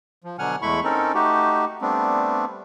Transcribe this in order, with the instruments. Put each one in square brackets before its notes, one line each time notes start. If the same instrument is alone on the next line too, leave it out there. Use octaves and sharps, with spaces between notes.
[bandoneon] F3
B2 D3 F#3 F#5 G#5 F6
E2 G#3 A3 E4 B5 C#6
C4 C#4 D#4 A4 A#4
A3 D#4 F#4 G4
G3 A3 B3 C4 D4